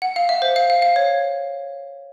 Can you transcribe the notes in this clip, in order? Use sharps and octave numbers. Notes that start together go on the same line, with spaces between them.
F#5
F5
E5
C5
F5
F5
F5
C#5